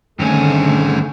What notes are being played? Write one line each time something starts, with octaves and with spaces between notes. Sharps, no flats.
G2 D3 D#3 A3 C4 C#4 G#4